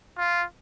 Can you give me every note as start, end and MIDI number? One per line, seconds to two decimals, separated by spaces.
0.18 0.44 65